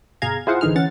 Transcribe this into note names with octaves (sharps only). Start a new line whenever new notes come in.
G1 B2 G#4 F5 A#5 G#6
E4 F4 G#4 C5 F5 F#5
A1 D3 E3 D#4 G#4 F6
E3 C#4 F#5 A6